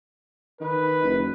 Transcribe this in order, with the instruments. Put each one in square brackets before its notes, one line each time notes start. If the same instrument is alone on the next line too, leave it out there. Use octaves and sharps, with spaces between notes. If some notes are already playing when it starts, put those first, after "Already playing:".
[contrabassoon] D#3 [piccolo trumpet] B4
[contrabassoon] F#1